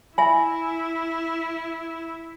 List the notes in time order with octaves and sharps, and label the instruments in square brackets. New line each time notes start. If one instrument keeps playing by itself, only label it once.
[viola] E4 [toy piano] E5 G#5 [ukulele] B5